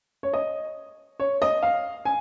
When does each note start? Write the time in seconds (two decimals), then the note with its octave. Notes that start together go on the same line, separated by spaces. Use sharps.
0.23 C#5
0.33 D#5
1.20 C#5
1.42 D#5
1.63 F5
2.05 G#5